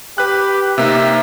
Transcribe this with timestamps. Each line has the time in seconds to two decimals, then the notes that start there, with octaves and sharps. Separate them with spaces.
0.18 G4 B4 F#6
0.78 C3 A#3 D#4 E5